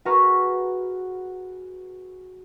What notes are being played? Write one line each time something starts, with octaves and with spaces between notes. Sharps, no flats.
F#4 G#4 B4 A#5 C#6 F6